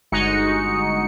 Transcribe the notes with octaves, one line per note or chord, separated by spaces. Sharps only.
G1 G#3 D#4 F#4 C#7